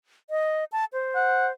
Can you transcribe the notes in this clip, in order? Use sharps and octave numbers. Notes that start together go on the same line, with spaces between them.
D#5
A5
C5
F#5